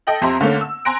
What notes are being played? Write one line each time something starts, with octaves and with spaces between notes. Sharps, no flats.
A4 D#5 G5 A#6 F#7
F2 C4 G4 E5 A#5 C6
D3 A3 A#3 C#4
E6
G#5 A#5 C6 F#6 A#6 D7